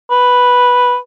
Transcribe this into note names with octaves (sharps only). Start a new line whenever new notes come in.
B4